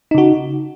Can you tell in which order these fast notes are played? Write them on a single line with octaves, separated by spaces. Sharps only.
D#4 C#3 F#4